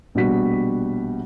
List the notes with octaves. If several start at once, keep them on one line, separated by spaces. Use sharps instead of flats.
A#1 B2 G3 F#4 B6